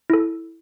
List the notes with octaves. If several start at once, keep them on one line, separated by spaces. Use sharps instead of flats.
E4 A4